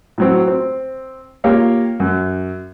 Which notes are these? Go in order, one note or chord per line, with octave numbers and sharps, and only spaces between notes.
A2 F#3 C4
C4
A#3 F4 G4 C#5 F5
F#2